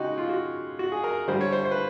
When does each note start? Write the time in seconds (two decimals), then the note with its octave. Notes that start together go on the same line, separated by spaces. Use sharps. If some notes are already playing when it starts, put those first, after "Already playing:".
Already playing: C#3 G#3 D#4 F#4 G4
0.18 F4
0.29 F#4
0.79 F#4
0.92 G#4
1.04 A#4
1.28 D3 G3 C5
1.41 C#5
1.52 C5
1.65 C5
1.71 B4